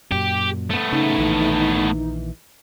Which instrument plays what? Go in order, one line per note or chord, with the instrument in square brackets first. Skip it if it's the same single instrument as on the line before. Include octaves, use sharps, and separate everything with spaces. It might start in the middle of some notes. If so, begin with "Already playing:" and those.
[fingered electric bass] F#2 A#2 [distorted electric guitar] G4
[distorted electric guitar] A3 B3
[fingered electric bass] C#3 [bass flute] D#4
[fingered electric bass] A#1 D#3 E3